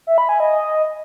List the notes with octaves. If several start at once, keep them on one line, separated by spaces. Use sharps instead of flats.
E5
B5
G#5
D#5